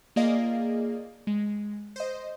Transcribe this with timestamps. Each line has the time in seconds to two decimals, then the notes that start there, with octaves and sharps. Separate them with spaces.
0.16 A#3 F4 G#4 D5 D#5 F5
1.27 G#3
1.96 C5 D#5